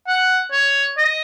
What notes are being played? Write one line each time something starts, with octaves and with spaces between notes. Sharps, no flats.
F#5
C#5
D#5